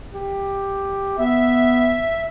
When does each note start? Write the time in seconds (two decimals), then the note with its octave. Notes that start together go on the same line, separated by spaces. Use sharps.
0.12 G4
1.19 B3 E5